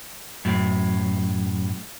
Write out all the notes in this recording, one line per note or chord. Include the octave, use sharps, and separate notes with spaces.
F#2 A2